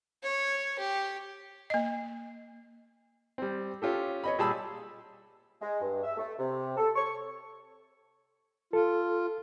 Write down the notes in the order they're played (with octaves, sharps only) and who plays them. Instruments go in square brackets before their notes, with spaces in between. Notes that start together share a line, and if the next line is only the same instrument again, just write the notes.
[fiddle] C#5
G4
[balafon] A#3 D#5
[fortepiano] G3 C4
C#4 F4 G4 A4
C#5 D#5 B5
A#2 G3 G#4 A5 B5 E6
[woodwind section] G#3
G2
E5
A3
C3
A4
C#6
[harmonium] F4 [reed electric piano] A4